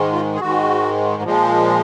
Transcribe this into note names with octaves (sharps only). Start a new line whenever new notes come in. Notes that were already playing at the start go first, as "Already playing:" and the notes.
Already playing: G#2 D#3 G#3
F4
G#4
G#2 D#3 G#3 F#4
A#2 F3 G#3